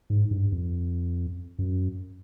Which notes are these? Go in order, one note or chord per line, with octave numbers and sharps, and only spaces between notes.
G#2
G2
F2
F#2